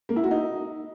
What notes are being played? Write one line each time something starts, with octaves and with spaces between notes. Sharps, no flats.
A#3
E4
F#4
D#4